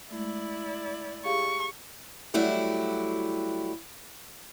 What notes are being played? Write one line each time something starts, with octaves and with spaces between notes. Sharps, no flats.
G#3 A3 E4 D5
G4 G#4 F5 C#6
F#3 G3 A3 E4 F#4 G4